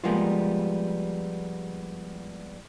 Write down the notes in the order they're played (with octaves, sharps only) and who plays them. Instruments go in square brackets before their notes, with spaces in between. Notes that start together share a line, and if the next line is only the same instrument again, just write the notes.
[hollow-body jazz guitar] F3 G3 G#3 A#3 B3 F4